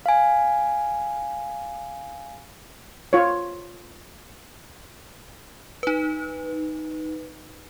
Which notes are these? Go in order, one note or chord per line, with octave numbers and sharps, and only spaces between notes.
F5 G#5
F4 C#5
D#4 B4